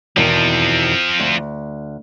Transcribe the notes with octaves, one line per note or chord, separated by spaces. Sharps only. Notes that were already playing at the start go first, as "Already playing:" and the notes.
E2 B2 D#3 F3 C4
D2